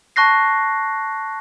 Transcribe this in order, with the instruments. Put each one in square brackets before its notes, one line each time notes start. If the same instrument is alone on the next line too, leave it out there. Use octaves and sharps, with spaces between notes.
[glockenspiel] A5 C#6 F#6 A#6 C7